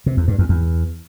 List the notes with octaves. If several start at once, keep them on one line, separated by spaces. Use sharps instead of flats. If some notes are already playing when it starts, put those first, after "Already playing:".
C3
E2
G2
E2
E2